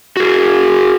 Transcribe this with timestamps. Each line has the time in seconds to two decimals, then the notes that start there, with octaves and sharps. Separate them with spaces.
0.17 F#4 G#4